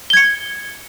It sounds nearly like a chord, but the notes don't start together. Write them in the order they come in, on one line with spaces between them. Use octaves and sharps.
G7 G#6 C#7